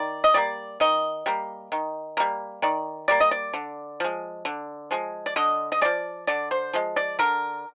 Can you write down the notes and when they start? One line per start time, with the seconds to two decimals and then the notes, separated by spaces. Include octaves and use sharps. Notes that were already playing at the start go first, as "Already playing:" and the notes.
Already playing: D#3 D5
0.24 D#5
0.34 G3 A#3 D5
0.80 D#3 D#5
1.26 G3 A#3
1.72 D#3
2.17 G3 A#3
2.62 D#3 D5
3.08 G3 A#3 D5
3.20 D#5
3.31 D5
3.54 D3
4.00 F3 G#3
4.45 D3
4.91 F3 G#3
5.26 D5
5.36 D3 D#5
5.72 D#5
5.81 F3 G#3 D5
6.27 D3 D5
6.51 C5
6.73 F3 G#3
6.96 D5
7.19 D3 A#4